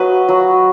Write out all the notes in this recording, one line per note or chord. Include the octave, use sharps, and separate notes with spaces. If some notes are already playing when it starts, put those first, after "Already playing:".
Already playing: F#3 B4 D#5
F#3